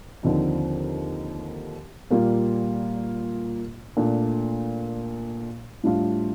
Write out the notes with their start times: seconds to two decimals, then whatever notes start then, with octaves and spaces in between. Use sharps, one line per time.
0.23 D#2 D3 F3 C4 D#4
2.11 A#2 G3 A#3 F4
3.97 A#2 A3 D4 F4
5.84 A2 G3 D4 F4